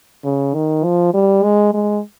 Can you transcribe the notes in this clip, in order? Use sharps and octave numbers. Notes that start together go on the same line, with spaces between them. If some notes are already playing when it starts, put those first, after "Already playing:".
C#3
D#3
F3
G3
G#3
G#3